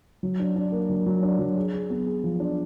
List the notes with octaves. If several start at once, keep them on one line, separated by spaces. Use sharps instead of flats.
F#3
D4
D4
A#3
F#3
F#3
D4
F#3
G#4
G#4
B3
G#4
F3
D4